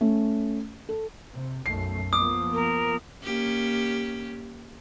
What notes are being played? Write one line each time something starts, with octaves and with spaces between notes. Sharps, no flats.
A3 C#4
A4
C3
B1 F#2 A3 C7
F3 A#3 B3 D6 D#6
A#4
A#3 C#4 G4